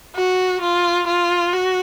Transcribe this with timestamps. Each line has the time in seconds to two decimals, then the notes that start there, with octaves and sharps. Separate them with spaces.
0.15 F#4
0.61 F4
1.07 F4
1.52 F#4